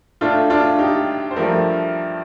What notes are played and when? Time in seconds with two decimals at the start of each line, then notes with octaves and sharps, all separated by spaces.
0.21 A2 A3 D4 F4
0.50 D4 F4
0.79 D#4 G4
1.31 C5
1.36 G2 F3 A3 G4 A#4